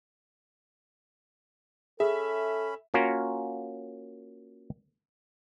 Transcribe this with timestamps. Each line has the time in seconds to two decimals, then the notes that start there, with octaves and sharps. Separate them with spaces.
2.00 C#4 G#4 A4 E5 B5
2.94 A#3 C#4 F4 F#4 A#4